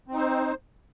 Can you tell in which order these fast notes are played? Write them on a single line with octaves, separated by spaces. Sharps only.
C4 D#4 C5